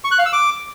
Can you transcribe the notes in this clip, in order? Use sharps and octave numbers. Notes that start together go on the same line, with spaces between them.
C#6
F#6
F5
E6
D6